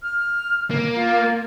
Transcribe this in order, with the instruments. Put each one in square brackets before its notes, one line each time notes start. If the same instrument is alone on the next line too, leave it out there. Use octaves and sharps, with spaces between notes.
[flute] F6
[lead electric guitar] A#3
[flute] F4